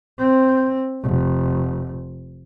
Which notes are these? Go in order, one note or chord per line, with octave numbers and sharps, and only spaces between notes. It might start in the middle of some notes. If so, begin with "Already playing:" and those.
C4
F1